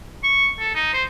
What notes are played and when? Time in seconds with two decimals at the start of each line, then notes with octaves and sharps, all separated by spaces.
0.23 C#6
0.59 A4
0.75 D#4
0.93 C5